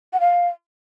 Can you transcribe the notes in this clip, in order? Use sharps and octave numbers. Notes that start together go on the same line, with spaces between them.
F#5
F5